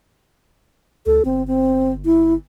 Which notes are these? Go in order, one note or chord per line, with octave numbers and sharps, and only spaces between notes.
D2 A4
G1 C4
C4
E4